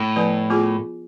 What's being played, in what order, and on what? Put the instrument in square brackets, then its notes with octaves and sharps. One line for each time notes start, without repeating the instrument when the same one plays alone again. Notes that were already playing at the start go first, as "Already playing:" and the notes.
Already playing: [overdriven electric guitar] A2
[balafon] F3 B3 E4 B4
B3 F4 G#4